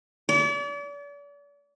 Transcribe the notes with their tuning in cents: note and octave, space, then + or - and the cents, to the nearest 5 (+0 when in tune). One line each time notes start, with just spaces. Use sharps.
D5 -40